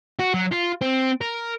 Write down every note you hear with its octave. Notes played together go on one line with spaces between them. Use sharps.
F#4
F#3
F4
C4
A#4